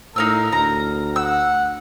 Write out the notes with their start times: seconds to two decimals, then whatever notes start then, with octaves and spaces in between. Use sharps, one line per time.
0.16 A2 D#4 A#4 F5 E6
0.52 D2 A#5
1.16 F#5 E6